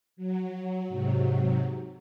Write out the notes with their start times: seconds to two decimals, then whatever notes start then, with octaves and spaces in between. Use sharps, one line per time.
0.16 F#3
0.88 G#2 C3 F#3